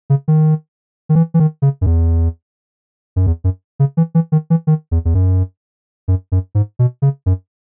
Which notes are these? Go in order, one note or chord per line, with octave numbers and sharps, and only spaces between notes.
C#3
D#3
D#3
E3
E3
D#3
C#3
F#2
E2
F#2
E2
F#2
C#3
E3
E3
D#3
E3
D#3
E2
E2
F#2
F#2
F#2
G#2
B2
C#3
F#2